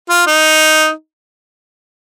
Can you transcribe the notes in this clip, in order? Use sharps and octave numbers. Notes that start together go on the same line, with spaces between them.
F4
D#4